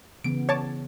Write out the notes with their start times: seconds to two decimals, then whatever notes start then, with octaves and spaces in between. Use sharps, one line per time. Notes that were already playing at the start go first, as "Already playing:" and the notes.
0.24 C#3 E3 B3 D7
0.49 C#5 A5 D6